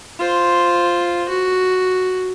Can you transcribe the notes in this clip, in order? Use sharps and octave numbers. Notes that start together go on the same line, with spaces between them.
F4 C5
F#4